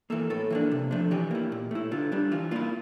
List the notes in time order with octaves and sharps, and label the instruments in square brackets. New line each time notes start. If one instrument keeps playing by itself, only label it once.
[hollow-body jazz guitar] E3 A#3 A4
A2 A4
E3 A#3 D4
C3
F3 A3 D4
E3 G4
A#3 E4
A#2
A3 E4
D3 F4
G3 D4
E3 F4
A#3 E4 F4